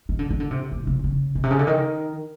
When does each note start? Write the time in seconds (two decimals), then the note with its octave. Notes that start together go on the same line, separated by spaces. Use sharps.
0.09 D#3
0.19 D3
0.31 D#3
0.40 D3
0.51 C3
0.72 A#2
0.87 C3
1.04 C#3
1.35 B2
1.44 C3
1.51 C#3
1.59 D3
1.67 D#3